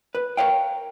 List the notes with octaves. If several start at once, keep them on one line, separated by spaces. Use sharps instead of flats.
B4
A#4 B4 C#5 F5 G5